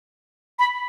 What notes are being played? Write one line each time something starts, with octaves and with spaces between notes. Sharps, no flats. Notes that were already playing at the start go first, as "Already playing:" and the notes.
B5